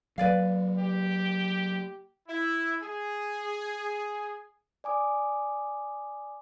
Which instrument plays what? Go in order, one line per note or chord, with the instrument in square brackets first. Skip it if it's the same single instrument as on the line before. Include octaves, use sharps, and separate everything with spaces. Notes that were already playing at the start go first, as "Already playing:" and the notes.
[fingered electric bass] F#3 A#3 [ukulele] B4 D5 F5
[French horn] G4
[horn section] E4
G#4
[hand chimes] D5 G#5 D6 D#6